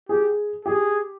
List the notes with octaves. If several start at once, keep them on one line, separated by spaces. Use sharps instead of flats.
G4 G#4
G4 G#4